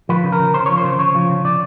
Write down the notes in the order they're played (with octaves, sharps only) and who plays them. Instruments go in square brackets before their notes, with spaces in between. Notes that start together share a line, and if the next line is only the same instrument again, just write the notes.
[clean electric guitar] F3 B4
C#3
A#4
C#3
C#3 C5
F3 C#5
C5
C#3
C#3 C#5
F3
C#3
C#3 D5